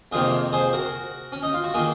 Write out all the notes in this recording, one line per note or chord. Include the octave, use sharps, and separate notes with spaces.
F2 C3 D#3 A#3 F4 G#4
G#4 C5
F#4 A#4
C#4
D#4
F4
F#4
D#3 A#3 F4 G#4